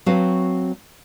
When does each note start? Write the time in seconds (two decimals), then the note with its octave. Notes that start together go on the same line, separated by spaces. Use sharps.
0.06 F#3 C4 F#4 B4 F5 A5